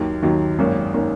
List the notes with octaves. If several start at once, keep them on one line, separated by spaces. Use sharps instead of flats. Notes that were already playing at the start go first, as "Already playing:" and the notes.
Already playing: D#2 D#3 F#3
D#2 D#3 F#3
G#1 F#2 D#3 A#3 C#4
D#3 A#3 C#4